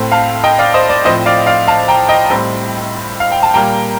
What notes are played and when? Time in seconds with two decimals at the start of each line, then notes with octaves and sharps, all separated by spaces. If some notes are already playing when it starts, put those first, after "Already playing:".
Already playing: A2 A3 C4
0.12 F5 A5
0.44 D#5 G5
0.59 D5 F5
0.74 C5 D#5
0.89 D5
1.05 A2 F3 C4 C5 D#5
1.26 D5 F5
1.47 D5 F5
1.67 F5 A5
1.88 G5 A#5
2.09 D#5 G5
2.30 A2 G3 C4
3.20 F5
3.32 G5
3.43 A5
3.54 A#2 G3 A#3 G5 A#5